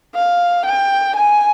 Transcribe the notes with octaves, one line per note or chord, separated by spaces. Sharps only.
F5
G5
G#5